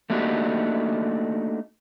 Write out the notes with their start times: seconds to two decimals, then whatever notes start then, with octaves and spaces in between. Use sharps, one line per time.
0.10 A3 A#3 D4 D#4 F#4 G4